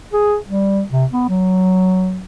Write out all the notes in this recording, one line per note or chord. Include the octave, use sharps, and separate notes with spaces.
G#4
G3
C3
B3
F#3